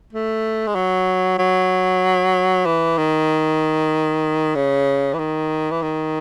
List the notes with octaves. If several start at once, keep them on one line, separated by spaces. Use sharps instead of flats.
A3
G#3
F#3
F#3
E3
D#3
C#3
E3
D#3
E3
D#3